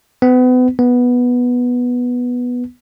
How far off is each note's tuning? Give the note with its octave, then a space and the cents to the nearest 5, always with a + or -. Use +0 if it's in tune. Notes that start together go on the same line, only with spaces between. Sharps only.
B3 +35
B3 -5